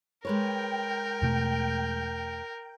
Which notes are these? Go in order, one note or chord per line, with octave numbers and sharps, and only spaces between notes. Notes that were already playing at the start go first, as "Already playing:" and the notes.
G#3 A#4 B4 C#5 G5
E2 B2 A3